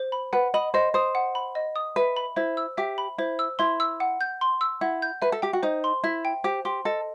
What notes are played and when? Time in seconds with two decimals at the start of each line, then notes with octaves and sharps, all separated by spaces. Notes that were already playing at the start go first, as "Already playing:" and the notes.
Already playing: C5
0.12 B5
0.33 B4 F#5
0.54 D#5 B5
0.74 C5 D#5
0.94 C5 D#6
1.15 F#5
1.35 B5
1.55 D#5
1.76 D#6
1.96 B4 E5
2.17 B5
2.36 E4 C5
2.57 E6
2.77 G4 E5
2.98 B5
3.18 E4 C5
3.39 E6
3.59 E4 C6
3.80 E6
4.00 F#5
4.21 G6
4.41 C6
4.61 E6
4.81 E4 F#5
5.02 G6
5.22 B4 E5
5.32 A4
5.42 G4 G5
5.53 F#4
5.63 D#4 C5
5.84 C6
6.04 E4 E5
6.25 G5
6.44 G4 C5
6.65 G4 C6
6.85 A4 D#5